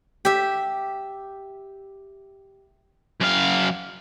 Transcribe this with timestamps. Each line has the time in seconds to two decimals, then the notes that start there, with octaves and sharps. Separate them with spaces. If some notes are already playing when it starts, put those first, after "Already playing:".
0.25 G4 E5
3.21 F#2 F5